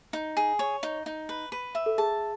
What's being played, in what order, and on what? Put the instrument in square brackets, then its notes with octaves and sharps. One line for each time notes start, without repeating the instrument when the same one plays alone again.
[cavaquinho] D#4
G#4
C#5
D#4
D#4
B4
B4
E5
[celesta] A4
[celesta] G#4 [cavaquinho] A5